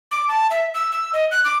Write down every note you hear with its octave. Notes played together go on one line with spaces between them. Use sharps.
D6
A5
E5
E6
E6
D#5
F#6
D6